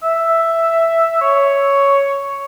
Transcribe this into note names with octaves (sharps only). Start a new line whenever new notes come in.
E5
C#5